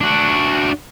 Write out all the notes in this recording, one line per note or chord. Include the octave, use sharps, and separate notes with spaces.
D4 F#4